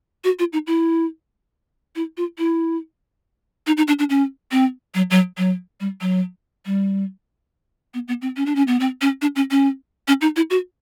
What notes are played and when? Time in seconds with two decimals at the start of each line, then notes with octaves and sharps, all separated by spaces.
0.24 F#4
0.39 F4
0.53 D#4
0.67 E4
1.96 E4
2.17 F4
2.38 E4
3.67 D#4
3.77 D#4
3.88 D4
3.99 D4
4.10 C#4
4.51 C4
4.95 F#3
5.11 F#3
5.38 F#3
5.80 G3
6.01 F#3
6.66 G3
7.94 B3
8.08 B3
8.22 C4
8.37 C#4
8.46 D4
8.56 C#4
8.67 B3
8.80 C4
9.01 C#4
9.22 D4
9.36 C#4
9.51 C#4
10.08 C#4
10.21 D#4
10.36 E4
10.50 F#4